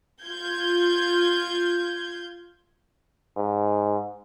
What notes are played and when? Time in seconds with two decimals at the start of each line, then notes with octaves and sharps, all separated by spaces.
0.23 F4 G6 G#6
3.37 G#2